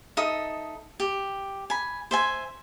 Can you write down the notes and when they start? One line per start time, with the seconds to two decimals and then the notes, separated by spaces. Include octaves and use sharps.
0.17 D#4 A4 E5 D#6
1.00 G4
1.70 G#5 B5
2.11 C5 E5 G#5